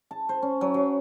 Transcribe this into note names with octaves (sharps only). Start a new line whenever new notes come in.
A5
C5
C#4
F#3
F#3